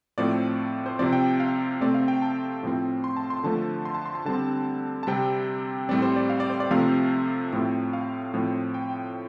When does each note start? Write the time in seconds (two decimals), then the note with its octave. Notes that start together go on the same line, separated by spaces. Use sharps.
0.18 A2 F3 A3 C4 D5
0.86 C5
0.99 C3 F3 C4 D5
1.13 G5
1.40 F5
1.81 C3 A3 C4 D5
1.94 F5
2.08 G5
2.22 A5
2.63 A2 F3 C4
3.04 C6
3.16 A5
3.30 C6
3.44 D3 F3 A3 A5
3.85 C6
3.95 A5
4.06 C6
4.15 A5
4.25 D3 G3 C4 A5
5.03 A5
5.07 C3 G3 C4 G5
5.89 A2 G3 C4 D5
6.02 C5
6.16 D5
6.29 F5
6.40 D5
6.50 C5
6.60 D5
6.71 C3 F3 A3 C4 F5
7.53 A2 F3 C4
7.93 F5
8.34 A2 F3 C4
8.74 G5